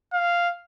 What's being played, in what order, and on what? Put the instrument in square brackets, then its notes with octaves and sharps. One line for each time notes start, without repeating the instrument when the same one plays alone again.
[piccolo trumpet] F5